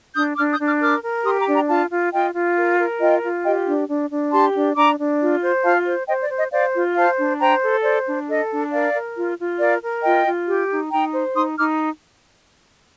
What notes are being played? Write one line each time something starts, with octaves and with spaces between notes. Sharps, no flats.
D4 D#6 G6
D4 D6 F6
D#6 G6
D4
D6 F6
A#4 D6 F6
A#4
G4 C6 D#6
A#5 D6
D4
G5 A#5
F4 F5 A5
F4
F4 D#5 G5
F4
A#4
A#4
F4 D#5 G5
F4
G4 D#5 G5
D4
D4
D4
G4 A5 C6
D4
D4 A#5 D6
D4
F4
C5
F4 F5 A5
C5
C5 D#5 G5
D5
C5
D#5
C5 D5 F5
F4
C5 F5 A5
D4
C5 G5 A#5
A4
C5 D5
D4
A4 D#5
D4
A#4 D5 F5
A#4
F4
F4
A#4 D5 F5
A#4
F4 D#5 G5
F4
G4
D#4
D#4 G5 A#5
C5
D#4 C6 D#6
D#4 D6 F6